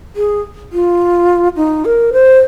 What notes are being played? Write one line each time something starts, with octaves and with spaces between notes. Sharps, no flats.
G#4
F4
D#4
A#4
C5